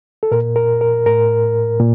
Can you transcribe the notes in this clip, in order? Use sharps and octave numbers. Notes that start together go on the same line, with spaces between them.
A4
A#2 A#4
A#4
A#4
A2 A#4
A#2